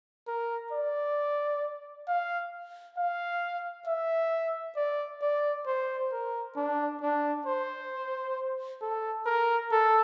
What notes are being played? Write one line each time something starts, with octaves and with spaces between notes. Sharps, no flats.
A#4
D5
F5
F5
E5
D5
D5
C5
A#4
D4
D4
C5
A4
A#4
A4